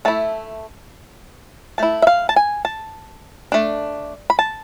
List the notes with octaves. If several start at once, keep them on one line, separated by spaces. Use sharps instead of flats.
A3 E4 A5
A3 E4 A5
E5
F5
A5
G#5
A5
A3 D4
B5
A5